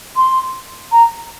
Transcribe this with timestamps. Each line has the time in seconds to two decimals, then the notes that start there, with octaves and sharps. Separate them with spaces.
0.16 C6
0.92 A#5